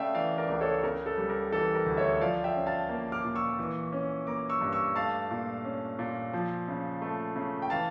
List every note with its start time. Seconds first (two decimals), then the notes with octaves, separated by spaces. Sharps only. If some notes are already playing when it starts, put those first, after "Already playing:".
Already playing: C#3 A3 D5 E5 F5 G5
0.14 E3 D5 F5
0.38 A#4 D5
0.49 C#2 A#4
0.61 A4 C#5
0.83 C#3 A#4
1.06 A4
1.18 G3
1.29 A#4
1.52 E3 A4
1.75 A#4
1.86 D2
1.97 C#5 E5
2.21 F3 D5 F5
2.44 E5 G5
2.56 C#4
2.66 F5 A5
2.89 A#3
3.12 D6 F6
3.24 A#2
3.36 C#6 E6
3.59 E3
3.93 C#4
4.27 A#3 A#5 D6
4.50 C#6 E6
4.61 G2
4.73 C#6 E6
4.95 A3 F5 A5
5.31 A#2
5.64 C#4
5.99 A#2
6.33 F3
6.68 C#3
7.02 A3
7.36 C#3
7.62 G5
7.70 E3 F5 A5